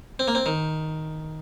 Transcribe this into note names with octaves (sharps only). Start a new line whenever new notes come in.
C4
A#3
C4
D#3